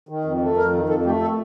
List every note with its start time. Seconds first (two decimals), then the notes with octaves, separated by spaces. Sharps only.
0.09 D#3
0.25 F2
0.41 A3
0.57 F2 A#4
0.73 D#3
0.89 F2 A4
1.05 A3 G4
1.22 A4